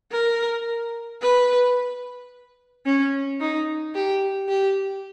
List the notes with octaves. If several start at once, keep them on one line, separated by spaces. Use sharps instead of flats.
A#4
B4
C#4
D#4
G4
G4